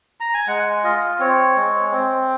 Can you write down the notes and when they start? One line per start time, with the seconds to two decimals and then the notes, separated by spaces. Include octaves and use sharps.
0.20 A#5
0.34 G#5
0.47 G#3 F#5
0.84 F4 D#5
1.19 C4 C#5
1.56 G#3
1.91 C4